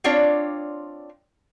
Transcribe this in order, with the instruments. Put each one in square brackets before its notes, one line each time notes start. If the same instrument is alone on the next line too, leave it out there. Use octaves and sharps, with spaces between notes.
[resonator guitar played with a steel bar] C4 D4 F4 C#5 D5